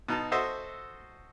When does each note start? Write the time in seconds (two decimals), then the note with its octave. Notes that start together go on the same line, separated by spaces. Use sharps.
0.08 B2 D#4 A5
0.32 F#4 A4 C5 D#5 E5